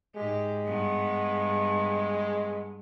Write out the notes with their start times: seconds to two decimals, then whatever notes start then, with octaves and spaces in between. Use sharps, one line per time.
0.16 G#2 G#3 G4
0.65 G2 B3